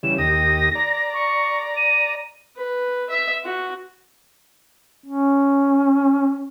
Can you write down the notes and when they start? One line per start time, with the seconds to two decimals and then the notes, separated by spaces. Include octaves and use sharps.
0.03 C#3 E3 G3 E7
0.18 D#2 G4 D#6 A#6
0.75 D5 A#5
1.13 C#6
1.76 D#7
2.56 B4
3.10 E5
3.44 F#4
5.06 C#4